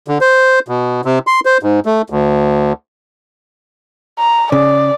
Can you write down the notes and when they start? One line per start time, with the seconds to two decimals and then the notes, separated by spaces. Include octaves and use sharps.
0.08 D3
0.21 C5
0.68 B2
1.05 C3
1.27 C6
1.45 C5
1.63 G#2
1.86 A3
2.10 D2
4.19 A#5
4.52 C#3 D5